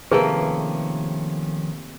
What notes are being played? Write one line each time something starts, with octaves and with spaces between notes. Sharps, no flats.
C3 D#3 F3 A3 A#3 C#4 G#4 B4